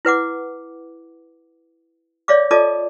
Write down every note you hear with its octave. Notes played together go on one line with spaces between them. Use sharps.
E4 B4 F#5 D6
C#5 D5 E5 F5 D6
F4 A4 D5 D#5 A5 D6